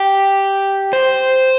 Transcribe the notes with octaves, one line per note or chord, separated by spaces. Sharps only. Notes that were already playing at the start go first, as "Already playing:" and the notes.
Already playing: G4
C5